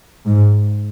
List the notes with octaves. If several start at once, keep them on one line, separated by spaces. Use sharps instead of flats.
G#2